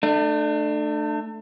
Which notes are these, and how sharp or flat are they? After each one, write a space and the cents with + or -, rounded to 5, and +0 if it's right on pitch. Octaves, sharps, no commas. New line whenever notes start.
A3 +0 D4 +35